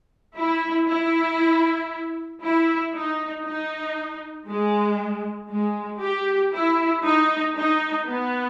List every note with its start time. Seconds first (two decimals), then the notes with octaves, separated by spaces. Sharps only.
0.36 E4
0.88 E4
2.42 E4
2.94 D#4
3.45 D#4
4.48 G#3
5.50 G#3
6.01 G4
6.53 E4
7.05 D#4
7.56 D#4
8.07 B3